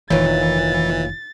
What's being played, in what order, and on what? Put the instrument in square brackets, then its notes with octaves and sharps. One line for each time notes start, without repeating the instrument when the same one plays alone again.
[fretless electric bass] F1 D#3 [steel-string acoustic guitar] D#2 A#2 [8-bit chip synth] E3 [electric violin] A6